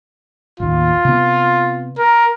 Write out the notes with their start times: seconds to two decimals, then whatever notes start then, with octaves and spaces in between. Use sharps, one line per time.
0.60 A1 D#2 F4
1.05 C3 B3
1.99 A#4